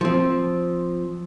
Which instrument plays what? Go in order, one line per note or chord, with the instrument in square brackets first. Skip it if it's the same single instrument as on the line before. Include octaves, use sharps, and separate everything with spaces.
[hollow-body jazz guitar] F3 C4